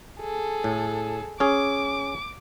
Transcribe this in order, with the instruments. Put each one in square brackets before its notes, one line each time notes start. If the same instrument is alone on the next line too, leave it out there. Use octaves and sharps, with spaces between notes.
[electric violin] G#4 A4
[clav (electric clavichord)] A2
[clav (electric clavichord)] C#4 G#4 [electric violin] D6